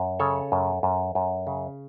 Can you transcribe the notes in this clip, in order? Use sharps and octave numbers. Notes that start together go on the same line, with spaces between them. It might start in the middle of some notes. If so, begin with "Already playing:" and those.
Already playing: F#2
C#3 A4 C#5
F#2
F#2
F#2
C#3